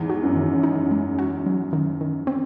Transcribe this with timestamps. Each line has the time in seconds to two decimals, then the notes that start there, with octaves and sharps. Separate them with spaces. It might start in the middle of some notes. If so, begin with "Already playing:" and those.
Already playing: E2 G#2
0.09 F#4
0.23 F#2
0.36 D#3
0.63 D#4
0.91 G#3
1.19 F#4
1.46 F#3
1.73 D#3
2.01 D#3
2.27 C4